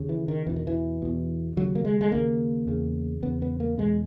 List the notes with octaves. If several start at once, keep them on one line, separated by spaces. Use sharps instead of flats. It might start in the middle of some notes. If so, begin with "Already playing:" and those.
Already playing: D#2 C#3
E3
D#3
E2 B2 E3
D#3
E3
E2 B2
D#2 C#3 F#3
A#3
G#3
G#3
D#2 C#3 A#3
E2 C#3
E2 C#3 B3
B3
A#3
E2 B2 G#3